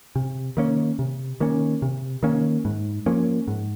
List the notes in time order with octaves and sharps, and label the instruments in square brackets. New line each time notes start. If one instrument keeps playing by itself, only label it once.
[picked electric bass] C3
D#3 A#3 C#4
C3
D#3 A#3 C#4
C3
D#3 A#3 C#4
G#2
F3 A#3 C#4
G#2